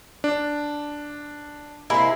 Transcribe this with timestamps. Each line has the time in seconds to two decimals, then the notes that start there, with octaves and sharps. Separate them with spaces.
0.24 D4
1.90 C3 G#3 A#3 E4